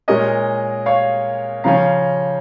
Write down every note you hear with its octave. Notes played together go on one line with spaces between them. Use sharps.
A#2 G#3 C#4 A#4 D#5
C#5 F5
C#3 F3 C#4 F5 A#5